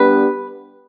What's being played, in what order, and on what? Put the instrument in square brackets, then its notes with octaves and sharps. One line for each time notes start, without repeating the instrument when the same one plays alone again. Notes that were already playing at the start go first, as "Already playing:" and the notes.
Already playing: [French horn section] G3 B3 D4 G4 [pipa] B4